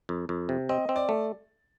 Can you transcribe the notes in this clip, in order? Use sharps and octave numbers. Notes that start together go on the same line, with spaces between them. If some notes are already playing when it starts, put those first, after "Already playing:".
F2
F2
C3
C4 D#5
C4
D5
A3